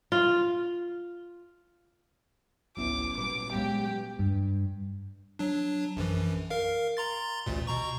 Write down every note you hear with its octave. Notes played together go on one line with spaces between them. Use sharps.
F4
G#1 C#2 F#3 B3 C#4 E4 D6
A#2 G3 B4 D6
F#3 G#3 B3 G4 F5
G2
F#3 D4
A#1 F#2 E3
A#4 F5
A#5 C6 A6
A1 D2 A#2
B2 A#5 C#6